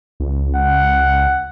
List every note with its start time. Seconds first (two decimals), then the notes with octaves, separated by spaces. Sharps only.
0.20 C#2
0.55 F#5